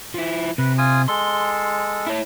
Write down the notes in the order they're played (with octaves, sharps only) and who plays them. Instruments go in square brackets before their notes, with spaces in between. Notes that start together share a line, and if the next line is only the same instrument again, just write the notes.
[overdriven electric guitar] F3 E4
[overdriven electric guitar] C3 [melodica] B4
[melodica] F4 G#5 D#6
[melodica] G#3 A4 [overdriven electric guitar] C6
[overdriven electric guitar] E4 C#5